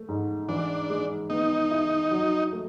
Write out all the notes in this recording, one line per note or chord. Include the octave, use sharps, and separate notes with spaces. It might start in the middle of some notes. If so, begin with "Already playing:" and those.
Already playing: A3
G#2
E3 D4
G#3
B3 D#4
E4
F#3
A3